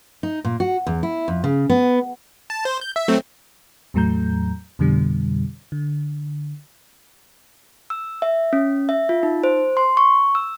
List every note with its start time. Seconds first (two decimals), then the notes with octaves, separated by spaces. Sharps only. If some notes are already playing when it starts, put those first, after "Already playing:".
0.23 D#4
0.45 A#2
0.60 F#4
0.87 E2
1.03 E4
1.28 F2
1.44 C#3
1.70 B3
2.50 A5
2.65 C5
2.81 G6
2.96 E5
3.08 F#3 A3 C4
3.94 E2 A2 F#3 A3 A#5 G6
4.79 F2 B2 D3 G3
5.72 D3
7.90 E6
8.22 E5
8.53 C#4
8.89 E5
9.09 F4
9.23 D#4
9.44 C5
9.77 C6
9.97 C#6
10.35 E6